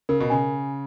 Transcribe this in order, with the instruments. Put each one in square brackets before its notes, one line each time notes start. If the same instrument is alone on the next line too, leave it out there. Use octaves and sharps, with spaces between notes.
[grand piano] C#3 [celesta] A#4
[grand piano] B2
[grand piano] C#3 [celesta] G#5